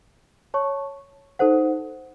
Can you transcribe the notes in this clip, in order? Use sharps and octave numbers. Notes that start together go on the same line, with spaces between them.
C#5 A5 C#6
D#4 A4 C5 F#5